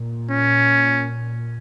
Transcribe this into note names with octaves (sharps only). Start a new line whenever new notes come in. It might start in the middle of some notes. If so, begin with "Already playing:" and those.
Already playing: A#2
C#4